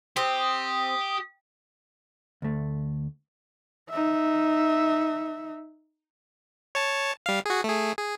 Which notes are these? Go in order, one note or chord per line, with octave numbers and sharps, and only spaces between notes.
C4 G4 D#6
D2 A3
D#4 E5
C#5 A5
G3 F5
F#4 G#4
A3 G#4
G#4